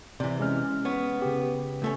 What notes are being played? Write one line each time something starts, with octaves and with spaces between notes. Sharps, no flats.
C3 E3 D5
G#3 C#4 F6
B3 C#5
C#3 G4
C#2 A3 C#4